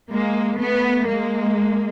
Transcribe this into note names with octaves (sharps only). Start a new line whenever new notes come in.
G#3 A#3
A3 B3
G#3 A#3